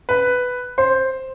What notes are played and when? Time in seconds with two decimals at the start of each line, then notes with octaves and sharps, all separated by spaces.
0.09 B4
0.78 C5